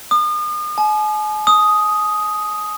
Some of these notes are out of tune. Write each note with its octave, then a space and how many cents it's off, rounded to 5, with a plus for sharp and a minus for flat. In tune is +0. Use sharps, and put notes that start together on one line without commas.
D#6 -40
G#5 +40
D#6 +5